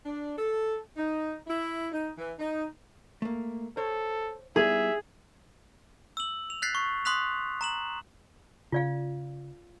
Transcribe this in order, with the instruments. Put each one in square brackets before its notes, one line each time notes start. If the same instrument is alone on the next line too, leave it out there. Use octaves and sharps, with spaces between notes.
[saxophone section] D4
A4
D#4
E4
D#4
E3
D#4
[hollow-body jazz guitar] A3 A#3
[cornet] A4 [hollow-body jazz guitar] C5 C#5
[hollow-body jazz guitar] G3 B3 E4 [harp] G#4 [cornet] E5
[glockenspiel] E6 F#7
F7
F#6 G6 A6 B6 C7
C#6
C6 D#6 F#6 B6 F7
A#5 E7 F#7
[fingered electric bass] C#3 [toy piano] F4 D5 F5